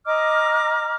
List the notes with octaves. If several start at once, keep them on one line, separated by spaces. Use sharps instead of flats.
D#5 A#5 D6 F6